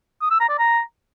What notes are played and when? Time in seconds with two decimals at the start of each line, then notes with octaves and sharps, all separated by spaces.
0.21 D#6
0.31 E6
0.40 A#5
0.49 D5
0.59 A#5